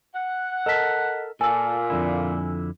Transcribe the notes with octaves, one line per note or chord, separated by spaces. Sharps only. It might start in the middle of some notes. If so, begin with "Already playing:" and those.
F#5
A4 A#4 D#5 A5 B6
A#2 A4 G#5 E6
F2 D3 E4